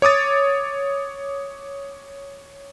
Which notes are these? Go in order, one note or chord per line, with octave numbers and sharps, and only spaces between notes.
C#5 D6 D#6 A6